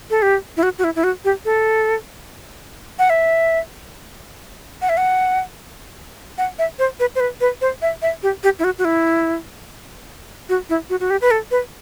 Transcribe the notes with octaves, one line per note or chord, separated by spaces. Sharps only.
A4
G4
E4
F#4
F#4
E4
E4
F#4
G4
A4
F#5
E5
F#5
E5
F#5
F#5
E5
C5
B4
C5
B4
B4
C5
E5
E5
G4
G4
E4
F#4
F#4
E4
F#4
E4
F#4
F#4
G4
B4
A4
B4